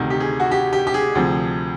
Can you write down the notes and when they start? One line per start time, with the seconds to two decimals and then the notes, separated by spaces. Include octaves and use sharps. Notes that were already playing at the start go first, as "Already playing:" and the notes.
Already playing: D2 C3 D#3
0.10 G4
0.20 G#4
0.40 F#4
0.51 G4
0.73 G4
0.87 G4
0.94 G#4
1.15 D2 C3 F3